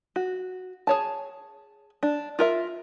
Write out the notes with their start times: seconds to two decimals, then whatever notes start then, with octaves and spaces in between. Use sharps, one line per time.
0.16 F#4
0.87 G#4 C#5 A5
2.03 D4
2.39 F4 A#4 E5